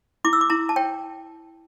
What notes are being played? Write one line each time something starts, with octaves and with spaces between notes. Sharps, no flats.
E4 D6
E6
D6
E4 A#5
A5
C#5 G5